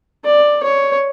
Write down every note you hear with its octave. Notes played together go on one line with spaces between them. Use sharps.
D5
C#5